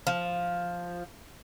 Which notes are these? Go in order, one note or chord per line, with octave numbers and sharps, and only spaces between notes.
F3